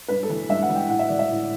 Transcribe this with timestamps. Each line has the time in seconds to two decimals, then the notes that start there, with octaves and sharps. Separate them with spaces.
0.08 G2 B4
0.23 A4
0.29 E3
0.49 G2 E5
0.62 F#5
0.69 E3
0.75 G5
0.89 A2 F#5
0.99 E5
1.09 E3 D5
1.19 E5
1.30 A2